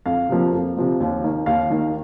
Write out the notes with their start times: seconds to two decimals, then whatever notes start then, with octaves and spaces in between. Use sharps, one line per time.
0.06 F2 F5
0.29 C3 F3 A#3
0.52 F2
0.77 C3 F3 A#3
1.00 D#2
1.24 D#3 A#3
1.46 D#2 F5
1.70 D#3 A#3